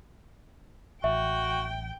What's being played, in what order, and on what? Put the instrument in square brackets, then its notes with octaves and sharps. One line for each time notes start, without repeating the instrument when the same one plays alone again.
[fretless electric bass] A1 [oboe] F#4 [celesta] E5 [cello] G5